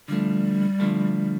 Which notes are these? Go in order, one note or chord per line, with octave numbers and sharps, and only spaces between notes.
D3 F3 G3 A3
D3 F3 A3